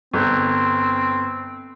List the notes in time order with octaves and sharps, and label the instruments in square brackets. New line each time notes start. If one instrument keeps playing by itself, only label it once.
[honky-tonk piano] G1 [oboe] C4